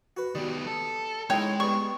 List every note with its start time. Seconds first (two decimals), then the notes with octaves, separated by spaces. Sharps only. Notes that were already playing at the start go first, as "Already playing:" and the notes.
0.17 F#4 B4
0.35 D#3 G3 B3
0.67 A4
1.30 G#3 C#4 D#4 E4 C#5 G5
1.60 G3 B3 C#6